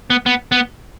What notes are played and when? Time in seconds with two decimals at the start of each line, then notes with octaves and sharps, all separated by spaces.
0.10 B3
0.26 B3
0.52 B3